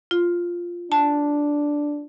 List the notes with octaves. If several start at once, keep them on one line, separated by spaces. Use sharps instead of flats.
F4
D4 A5